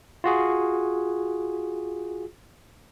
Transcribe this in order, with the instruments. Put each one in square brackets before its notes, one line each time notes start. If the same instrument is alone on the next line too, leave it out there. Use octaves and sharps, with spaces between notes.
[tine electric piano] F4 F#4 G#4